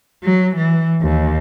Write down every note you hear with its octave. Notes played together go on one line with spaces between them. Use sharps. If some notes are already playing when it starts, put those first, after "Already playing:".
F#3
E3
D#2